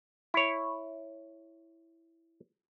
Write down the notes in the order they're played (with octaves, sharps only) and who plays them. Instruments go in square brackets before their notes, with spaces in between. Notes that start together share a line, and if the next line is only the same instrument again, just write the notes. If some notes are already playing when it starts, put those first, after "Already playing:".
[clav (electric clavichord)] E4 C#5